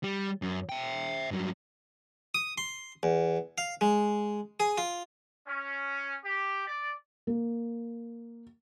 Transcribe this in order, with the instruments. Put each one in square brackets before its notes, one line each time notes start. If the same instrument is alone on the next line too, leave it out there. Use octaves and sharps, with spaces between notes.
[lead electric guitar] G3
F#2
E5 G5
G2 F#3
[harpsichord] D#6
C6
E2
F5
G#3
G#4
F4
[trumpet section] C#4
G4
D5
[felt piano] A#3